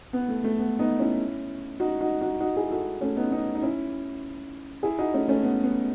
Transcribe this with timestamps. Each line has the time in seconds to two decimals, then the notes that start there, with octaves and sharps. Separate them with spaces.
0.13 B3
0.28 A3
0.44 A3
0.59 B3
0.79 B3 D#4
0.99 C#4 E4
1.80 D#4 F#4
2.01 D#4 F#4
2.21 D#4 F#4
2.40 D#4 F#4
2.56 E4 G#4
2.71 F#4 A4
3.01 A3 C#4
3.16 B3 D#4
3.31 B3 D#4
3.55 D#4
3.62 C#4 E4
4.83 E4 G#4
4.98 D#4 F#4
5.14 A3 C#4
5.29 A3 C#4
5.43 B3
5.64 B3